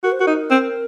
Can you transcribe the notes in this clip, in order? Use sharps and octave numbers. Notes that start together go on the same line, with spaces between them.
F#4 A#4
C5
F#4 A#4
D#4
C4